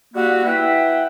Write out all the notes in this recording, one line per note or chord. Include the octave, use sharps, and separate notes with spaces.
G3 A#3 E4 F#4
E4 B4 E5 F#5 G5